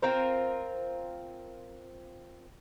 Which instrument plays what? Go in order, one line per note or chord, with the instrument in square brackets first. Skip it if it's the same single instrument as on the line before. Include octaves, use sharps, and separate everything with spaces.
[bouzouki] C4 F4 A#4 C5